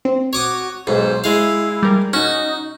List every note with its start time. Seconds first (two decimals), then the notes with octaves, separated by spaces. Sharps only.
0.05 C4
0.33 F#4 C#5 D6 D#6
0.87 B1 G#2 C5
1.24 G#3 E4 F5
1.83 G3 A#4
2.13 C#4 D#4 F#4